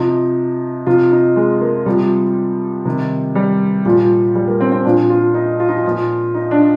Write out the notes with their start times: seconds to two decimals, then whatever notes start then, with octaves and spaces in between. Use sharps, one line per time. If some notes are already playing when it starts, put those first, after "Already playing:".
Already playing: C3 F3 D#4
0.86 C3 F3 F4
1.11 D#4
1.36 G#3
1.61 A#3
1.86 C3 F3 G3
2.85 C3 D#3
3.35 G3
3.85 A#2 F3 G3
4.35 G3
4.48 A#3
4.60 C4
4.72 C4
4.85 A#2 F3 D4
5.10 F4
5.34 D#4
5.60 F4
5.68 D#4
5.77 F4
5.84 A#2 F3
6.34 D#4
6.51 D4
6.59 D#4